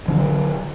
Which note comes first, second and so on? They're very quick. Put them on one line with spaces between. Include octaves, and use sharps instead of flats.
E3 D3 F#3